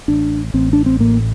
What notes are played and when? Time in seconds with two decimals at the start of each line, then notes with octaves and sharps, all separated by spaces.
0.08 A1 D4
0.54 A1 C4
0.73 D4
0.86 C4
1.00 A2 A#3